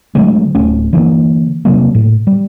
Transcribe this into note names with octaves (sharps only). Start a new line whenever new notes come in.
D3 F#3 G#3 A3
D1 A3 C#4
D3 E3 G#3 A#3
C3 F3 F#3 A#3
A2
G3